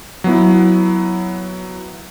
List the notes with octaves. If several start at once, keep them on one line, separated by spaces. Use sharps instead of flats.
F#3 B3 E4